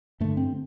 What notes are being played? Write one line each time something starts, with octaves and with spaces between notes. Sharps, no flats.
G2 D3 A3
C4